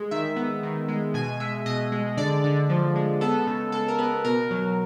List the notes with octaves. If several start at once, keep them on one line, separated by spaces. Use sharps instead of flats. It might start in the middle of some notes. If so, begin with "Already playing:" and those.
Already playing: G#3
D#3 E5
B3
D#3
G#3
B2 G#5
G#3 E5
B2 D#5
G#3
D3 D5
D3
F3
G#3
B3 A4
C#3
G#3 A4
A#4
B3 B4
B2 A#4
F#3